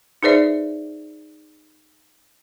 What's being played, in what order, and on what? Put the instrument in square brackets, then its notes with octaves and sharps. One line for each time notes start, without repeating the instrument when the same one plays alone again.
[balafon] D#4 G#4 B4 C5 D5 E5